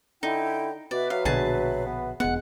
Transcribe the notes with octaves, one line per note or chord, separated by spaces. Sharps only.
D3 D#4 E4 G5
B2 F#4 B4 D5 E5
F#3 F5
A#1 B2 D3 G#4 A5
B3
E1 G#3 B3 F#5